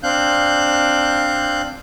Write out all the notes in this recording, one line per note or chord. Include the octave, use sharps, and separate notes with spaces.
C4 D4 F5 F#6 G6